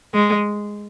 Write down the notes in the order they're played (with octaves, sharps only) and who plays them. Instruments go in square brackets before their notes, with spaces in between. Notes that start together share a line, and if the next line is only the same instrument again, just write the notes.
[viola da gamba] G#3